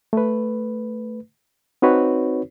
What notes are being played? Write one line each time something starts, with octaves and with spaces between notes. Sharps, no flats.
A3 B4
C4 D#4 F#4 B4 C#5